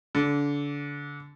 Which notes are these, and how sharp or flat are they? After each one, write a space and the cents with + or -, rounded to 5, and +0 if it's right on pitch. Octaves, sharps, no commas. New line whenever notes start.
D3 -30